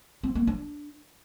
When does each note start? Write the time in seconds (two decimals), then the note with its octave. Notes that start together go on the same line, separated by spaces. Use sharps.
0.23 C4
0.35 A#3
0.47 D4